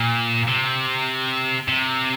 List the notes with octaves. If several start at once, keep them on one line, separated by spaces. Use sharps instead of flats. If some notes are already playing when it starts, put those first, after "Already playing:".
Already playing: A#2
C3
C3